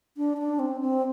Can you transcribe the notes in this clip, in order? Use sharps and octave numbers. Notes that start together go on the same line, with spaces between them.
D4
D4
C4
C4